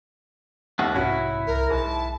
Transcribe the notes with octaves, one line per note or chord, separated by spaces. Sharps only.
D#2 A3 B3 F#4
B1 G#2 C3 C#4 E4 F#4
C2 A#4
B1 G#2 A5